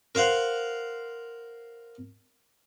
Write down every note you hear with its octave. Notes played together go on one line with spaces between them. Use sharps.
A#4 C5 F5 F#5